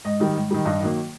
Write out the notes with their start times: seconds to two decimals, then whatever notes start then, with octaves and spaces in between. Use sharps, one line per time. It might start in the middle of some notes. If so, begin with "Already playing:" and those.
0.05 G#2 D#5
0.20 D#3 G3
0.35 G#2
0.51 D#3 G3
0.66 G2 D#5
0.80 D#3 F#3 A#3